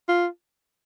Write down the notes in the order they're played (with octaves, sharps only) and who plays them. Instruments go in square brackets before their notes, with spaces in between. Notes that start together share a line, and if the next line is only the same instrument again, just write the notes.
[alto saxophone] F4